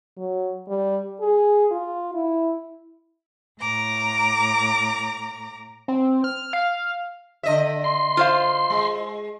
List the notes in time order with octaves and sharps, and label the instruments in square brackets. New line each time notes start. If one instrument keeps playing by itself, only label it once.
[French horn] F#3
G3
G#4
F4
E4
[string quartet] A2 A#5 D6
[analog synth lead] C4
F6
F5
[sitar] D3 D#5 E5
[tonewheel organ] C6
[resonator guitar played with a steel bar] F4 C5 F5
[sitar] G#3